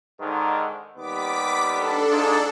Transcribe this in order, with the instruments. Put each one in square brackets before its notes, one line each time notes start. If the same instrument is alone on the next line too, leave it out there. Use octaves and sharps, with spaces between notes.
[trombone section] G#2 D3 D#3
[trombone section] D#2 G3 B3 [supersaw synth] D6 B6
[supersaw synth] D4 A4
[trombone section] G#2 F4 G#4